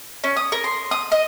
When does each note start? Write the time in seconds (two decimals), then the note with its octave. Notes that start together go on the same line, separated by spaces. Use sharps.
0.24 C#4
0.36 D#6
0.52 A#4
0.64 C6
0.91 D#6
1.12 D#5